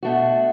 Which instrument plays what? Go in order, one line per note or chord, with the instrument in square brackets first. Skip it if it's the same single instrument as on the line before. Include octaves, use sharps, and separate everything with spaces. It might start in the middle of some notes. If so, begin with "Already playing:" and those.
[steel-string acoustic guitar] B2 A3 D4 F#4